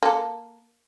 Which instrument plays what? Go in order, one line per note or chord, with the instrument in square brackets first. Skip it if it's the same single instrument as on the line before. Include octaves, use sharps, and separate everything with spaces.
[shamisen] A#3 A4